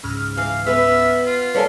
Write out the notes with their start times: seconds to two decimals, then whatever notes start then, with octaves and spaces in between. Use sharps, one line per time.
0.03 C#2 G#2 F6
0.37 E3 F5
0.66 B3 B4 E5
1.26 F4
1.55 A#3 A4 B4 C#5 D5 G#5